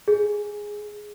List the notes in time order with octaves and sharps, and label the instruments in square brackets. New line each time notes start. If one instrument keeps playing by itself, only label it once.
[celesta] G#4